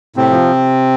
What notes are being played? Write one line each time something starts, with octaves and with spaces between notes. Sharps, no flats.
A2 C3 C4
F3